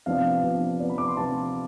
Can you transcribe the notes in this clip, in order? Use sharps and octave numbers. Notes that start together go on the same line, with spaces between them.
C3 F3 B3 D4 F5
C3 F3 B3 D4
C3 F3 B3 D4 D5
B5
D6
C6
C3 F3 B3 D4 A5